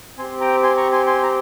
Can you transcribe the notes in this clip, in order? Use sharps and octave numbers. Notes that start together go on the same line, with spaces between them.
C4 G4 G#5 C6
G5 A#5
G#5 C6
A#5 C#6
G#5 C6
G#5 C6
A#5